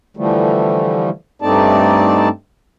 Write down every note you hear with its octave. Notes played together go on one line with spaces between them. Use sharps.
D3 E3 F3 G3 A3
G2 A3 C4 D#4 D5 A5